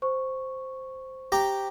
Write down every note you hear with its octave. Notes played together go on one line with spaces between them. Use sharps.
C5 C#6
G4 A#5